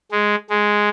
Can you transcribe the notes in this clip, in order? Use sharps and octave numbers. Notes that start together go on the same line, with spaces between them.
G#3
G#3